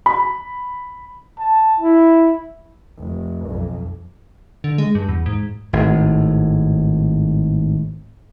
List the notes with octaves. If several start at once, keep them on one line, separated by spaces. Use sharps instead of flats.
B5
A5
E4
F1
B1 F2
D3
G#3
G2
E2
G#2
G#1 A2